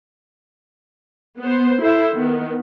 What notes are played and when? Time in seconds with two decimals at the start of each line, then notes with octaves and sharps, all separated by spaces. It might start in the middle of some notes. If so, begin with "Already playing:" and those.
1.40 B3 C5
1.81 E4 A4 C5 E5
2.14 D#3 B3